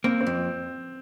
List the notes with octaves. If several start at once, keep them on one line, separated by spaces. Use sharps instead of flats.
A#3 C4
C4
F2